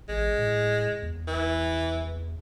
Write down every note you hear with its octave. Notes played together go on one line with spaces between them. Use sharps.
A1 G#3
A2
E2
E3